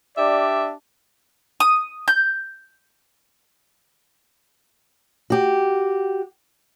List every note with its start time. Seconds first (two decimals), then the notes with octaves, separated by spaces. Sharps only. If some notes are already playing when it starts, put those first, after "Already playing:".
0.17 D4 G4 D5 E5
1.60 D#6
2.08 G6
5.30 F#4 G4